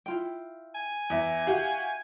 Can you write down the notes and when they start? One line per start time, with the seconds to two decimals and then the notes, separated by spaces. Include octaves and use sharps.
0.06 E4 F4 G5
0.75 G#5
1.10 E2 E4 E5
1.47 F#4 G4 F5